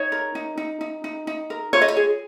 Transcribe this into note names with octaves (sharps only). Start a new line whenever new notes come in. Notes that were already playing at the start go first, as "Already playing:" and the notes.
Already playing: D#4 C#5
A#4
D#4
D#4
D#4
D#4
D#4
A#4
F4 C#5
D#5
C#5
G#4